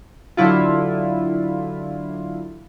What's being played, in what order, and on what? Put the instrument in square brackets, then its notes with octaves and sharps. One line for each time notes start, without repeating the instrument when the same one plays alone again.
[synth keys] D3 F#3 E4 F4